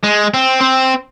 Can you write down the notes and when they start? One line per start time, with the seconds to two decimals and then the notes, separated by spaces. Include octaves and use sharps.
0.03 G#3
0.34 C4
0.61 C4